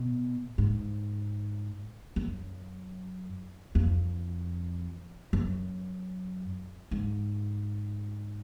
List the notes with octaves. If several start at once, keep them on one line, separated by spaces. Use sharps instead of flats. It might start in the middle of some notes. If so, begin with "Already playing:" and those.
Already playing: B2
G#2
F#2
F2
F#2
G#2